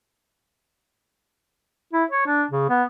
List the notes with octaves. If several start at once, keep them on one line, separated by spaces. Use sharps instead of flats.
E4
C#5
D4
C#3
B3